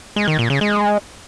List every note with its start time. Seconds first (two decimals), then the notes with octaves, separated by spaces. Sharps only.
0.16 G#3
0.28 D#3
0.39 A#2
0.50 C#3
0.61 G#3